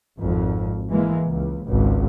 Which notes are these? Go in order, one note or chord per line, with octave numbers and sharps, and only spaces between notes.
G#1 F2
E3 G#3 A#3
C#2
G#1 C#2